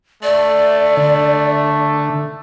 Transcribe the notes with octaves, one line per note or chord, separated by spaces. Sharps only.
A3 D5
D3